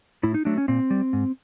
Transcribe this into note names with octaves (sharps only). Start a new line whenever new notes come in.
A2 E4
D#4
F#3 A3 D4
C#4
A#2 C4
G3
G#2